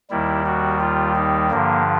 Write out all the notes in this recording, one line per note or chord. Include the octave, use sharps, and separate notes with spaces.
D#2 D#3 G3 E4
F#4
F4
D#4
G2 D3 F3 A#3